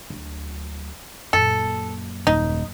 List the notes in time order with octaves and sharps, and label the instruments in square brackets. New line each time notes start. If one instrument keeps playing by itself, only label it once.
[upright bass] D2 F#3
[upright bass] F#2 A#2 [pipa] A4
[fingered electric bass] D#1 [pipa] D#4